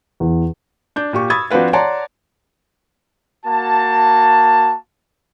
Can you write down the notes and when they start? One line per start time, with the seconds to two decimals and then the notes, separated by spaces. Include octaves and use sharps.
0.20 E2
0.96 D4 G6
1.13 A#2 G4 C#6
1.30 B5 C#6 D#6 E6 G#6 A6
1.51 F3 C4 D4 F#4 B4 F5
1.73 C#5 D5 F#5 A5 A#5 C6
3.45 A#3 F#4 A5